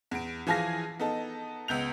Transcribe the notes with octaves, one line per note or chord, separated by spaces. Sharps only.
E2 D7
E3 F3 G#4 F5 G#5 A#6
B3 D#4 A4
C#2 B3 G6 F7